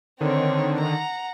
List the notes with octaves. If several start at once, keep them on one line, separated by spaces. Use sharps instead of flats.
D3 D#3 C4 C#5
F#5 A#5